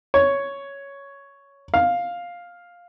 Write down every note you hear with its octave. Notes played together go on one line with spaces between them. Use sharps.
C#5
F5